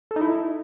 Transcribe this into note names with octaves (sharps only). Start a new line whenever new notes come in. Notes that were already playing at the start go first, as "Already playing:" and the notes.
A4
D#4
E4